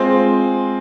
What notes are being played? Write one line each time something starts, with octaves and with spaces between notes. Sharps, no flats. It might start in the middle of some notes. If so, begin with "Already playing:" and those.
Already playing: G#3 C4 F4 C5